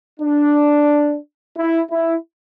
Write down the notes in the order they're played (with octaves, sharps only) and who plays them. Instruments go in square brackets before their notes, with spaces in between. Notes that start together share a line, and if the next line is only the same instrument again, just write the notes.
[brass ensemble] D4
E4
E4